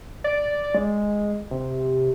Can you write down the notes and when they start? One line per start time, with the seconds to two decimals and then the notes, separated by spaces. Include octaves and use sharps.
0.24 D5
0.75 G#3
1.51 C3